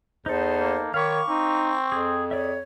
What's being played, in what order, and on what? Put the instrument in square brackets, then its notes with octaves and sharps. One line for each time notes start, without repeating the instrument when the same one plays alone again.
[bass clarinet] E2 [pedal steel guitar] D#4 A4 [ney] C5
[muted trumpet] A#3
[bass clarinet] D#3 [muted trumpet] C#5 [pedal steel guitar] F5 B5 D6 [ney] C#6
[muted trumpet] C4 [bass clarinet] D#4
[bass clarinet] F2 [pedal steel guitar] G#4
[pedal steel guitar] G#4 D5 E5 [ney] C#5